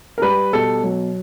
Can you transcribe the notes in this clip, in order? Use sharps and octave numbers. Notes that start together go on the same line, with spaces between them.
A#4
G3 B4
B2 A4
F#3